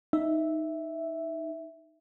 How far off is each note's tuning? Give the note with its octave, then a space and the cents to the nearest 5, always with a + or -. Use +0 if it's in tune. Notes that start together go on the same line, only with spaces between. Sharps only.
D#4 +5 E5 +0